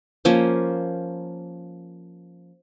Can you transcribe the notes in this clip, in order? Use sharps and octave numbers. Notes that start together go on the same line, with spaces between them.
F3 A#3 C#4 C5